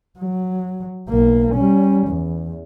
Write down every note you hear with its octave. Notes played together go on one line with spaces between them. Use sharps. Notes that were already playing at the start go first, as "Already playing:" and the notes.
F#3
B1 A#3
G3 C#4
E2